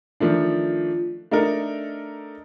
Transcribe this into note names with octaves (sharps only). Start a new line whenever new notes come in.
D#3 F3 A3 D4
A3 D4 D#4 A4 A#4